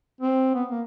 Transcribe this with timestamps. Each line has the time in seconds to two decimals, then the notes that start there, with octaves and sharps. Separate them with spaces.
0.21 C4
0.55 B3
0.71 A#3